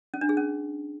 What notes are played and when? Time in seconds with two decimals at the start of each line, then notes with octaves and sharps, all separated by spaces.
0.14 C#4
0.21 D4
0.29 G#4
0.37 C#4